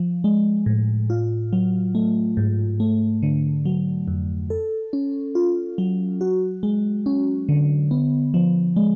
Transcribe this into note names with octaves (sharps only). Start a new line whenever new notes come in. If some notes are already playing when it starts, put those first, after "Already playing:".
Already playing: F3
G#3
A2
F4
F#3
A3
G#2
A3
D3
F#3
F2
A4
C#4
F4
F#3
F#4
G#3
C#4
D3
B3
F3
G#3